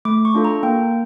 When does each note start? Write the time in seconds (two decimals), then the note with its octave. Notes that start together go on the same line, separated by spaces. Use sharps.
0.05 A3 D6
0.25 C#6
0.35 D4 F4 A4
0.45 A#5
0.63 A#3 G5